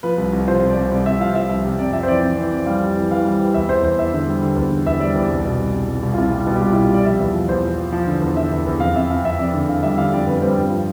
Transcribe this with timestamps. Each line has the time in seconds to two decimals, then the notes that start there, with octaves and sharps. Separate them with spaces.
0.03 F3 B4
0.18 C2
0.33 C2
0.48 F3 C5
0.60 C2 C5
0.69 D5
0.77 C2
0.85 C5
0.91 C2 D5
1.06 C2 E5
1.20 F3 F5
1.35 F3 E5
1.49 C2
1.65 C3
1.79 F2 D5
1.93 F2 E5
2.03 C5
2.08 E3 D5
2.23 F2
2.37 E3
2.51 F2
2.66 G3 F5
2.81 F2
2.96 E3
3.10 E3 F5
3.25 G3
3.39 E3
3.54 E2 E5
3.69 E2 C5
3.83 E2 C5
3.99 E2 E5
4.13 D3
4.27 G3
4.42 D3
4.56 E2
4.71 D3
4.86 E2 E5
5.00 G3 D5
5.15 E2 D5
5.30 C2
5.45 B2
5.59 C2
5.73 C2
5.89 C2
6.03 C2
6.14 F4
6.18 C2 E4
6.32 G3
6.46 B2
6.56 G4
6.61 C2 F4
6.72 B2 E4
6.83 F4
6.90 G3 D5
7.05 F3 E5
7.20 E2
7.34 F3
7.49 E2 C5
7.64 F3
7.78 F3
7.92 F3
8.07 D3
8.22 E2
8.36 D3 E5
8.52 E2
8.66 E2
8.80 F2 F5
8.95 F2 E5
9.10 F2 F5
9.24 F2 E5
9.39 F2 D5
9.54 D3
9.68 D3 F5
9.83 G3 E5
9.98 D3 F5
10.13 F2 D5
10.27 F2 B4
10.38 B4
10.42 G3 C5
10.56 G2
10.70 F3